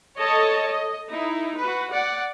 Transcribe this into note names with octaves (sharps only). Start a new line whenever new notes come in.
A4 C#5 D#5 A5
D#5
D#4 E4
F#4 B4
D5 F#5